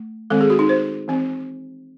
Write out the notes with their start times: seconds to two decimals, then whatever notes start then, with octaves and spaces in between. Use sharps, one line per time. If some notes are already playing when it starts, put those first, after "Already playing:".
Already playing: A3
0.30 D#3 G#3 C4 A4
0.41 G#4
0.50 F#4
0.59 D#4
0.69 C5
1.08 E3 C4